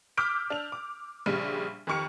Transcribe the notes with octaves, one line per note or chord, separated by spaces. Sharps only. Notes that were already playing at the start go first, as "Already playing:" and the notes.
D6 E6 F6 G6 B6 D7
D4 F7
D6
A#1 C#3 G3
F2 D#3 G4 C#6 F6 C#7